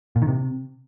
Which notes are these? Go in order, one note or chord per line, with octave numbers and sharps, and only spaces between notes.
A#2
D#3
C3